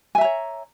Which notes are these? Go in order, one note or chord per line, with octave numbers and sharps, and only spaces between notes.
C#5 E5 G#5 A#5